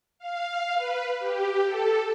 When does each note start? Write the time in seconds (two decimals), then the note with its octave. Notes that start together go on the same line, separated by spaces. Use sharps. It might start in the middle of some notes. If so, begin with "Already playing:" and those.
0.19 F5
0.75 B4
1.19 G4
1.65 A4